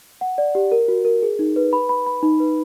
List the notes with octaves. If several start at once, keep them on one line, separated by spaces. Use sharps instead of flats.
F#5
D5
G4
A#4
F#4
A#4
G#4
D#4
B4
B5
B5
B5
D#4
B4